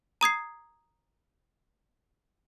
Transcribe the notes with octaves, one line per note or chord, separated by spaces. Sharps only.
A#5 D#6 G#6 C7